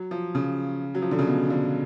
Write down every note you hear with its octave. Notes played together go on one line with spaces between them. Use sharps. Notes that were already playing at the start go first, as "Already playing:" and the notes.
Already playing: F#3
F3
C#3
F#3
F3
D3
C#3
B2
D3